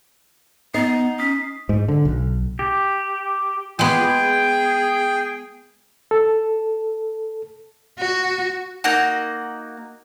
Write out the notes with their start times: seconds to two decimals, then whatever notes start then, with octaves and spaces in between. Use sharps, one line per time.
0.74 B3 D#4 C7
1.19 C#4 D#6 B6
1.69 G#2
1.88 D3
2.05 B1
2.59 G4
3.79 G#3 B3 F4 G4 G#4 G5
4.02 G#4
6.11 A4
7.98 F#4
8.84 A#3 D#4 F#4